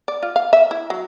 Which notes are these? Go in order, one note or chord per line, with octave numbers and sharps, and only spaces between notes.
D5
F4
F5
E5
E4
F#3